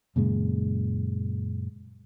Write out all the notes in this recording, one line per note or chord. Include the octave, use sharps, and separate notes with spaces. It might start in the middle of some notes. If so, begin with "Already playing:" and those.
F#2 A#2 C#3 G#3